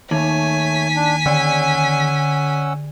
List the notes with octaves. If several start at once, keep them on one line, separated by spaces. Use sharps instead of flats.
D#2 A3 D#4 C#5 G#5 B6
D4
D3 C#4 D5 F#5 E6